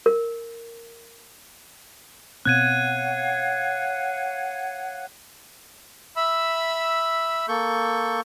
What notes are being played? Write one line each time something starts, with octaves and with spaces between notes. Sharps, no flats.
A#4
B2 C4 C#5 F5 F#5 F#6 G#6 D#7
E5 B5 E6
A#3 A4 C#6 G6